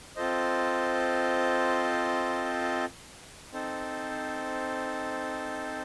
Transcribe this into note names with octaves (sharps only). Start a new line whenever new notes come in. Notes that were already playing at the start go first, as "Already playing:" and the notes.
C4 F4 A4 C5 D#5
C4 D#4 A4 C5